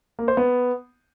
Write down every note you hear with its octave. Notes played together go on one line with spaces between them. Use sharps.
A#3
C5
B3